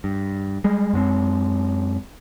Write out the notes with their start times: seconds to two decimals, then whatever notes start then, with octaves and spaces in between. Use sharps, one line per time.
0.04 G2
0.64 G3 G#3
0.93 F#2 G#3 C4